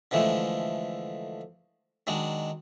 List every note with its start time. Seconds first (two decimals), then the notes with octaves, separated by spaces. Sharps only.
0.11 D3 E3 F3 G#3 A3
2.07 D#3 F#3 G#3 D4